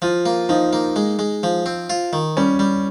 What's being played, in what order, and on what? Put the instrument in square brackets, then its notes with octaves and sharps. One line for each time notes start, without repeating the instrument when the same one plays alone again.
[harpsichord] F3 [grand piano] F4
[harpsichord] A#3
[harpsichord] F3 [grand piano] D#4
[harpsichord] A#3
G#3
G#3
F3
C4
F4
D#3
[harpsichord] G3 [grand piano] C#4
[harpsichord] G3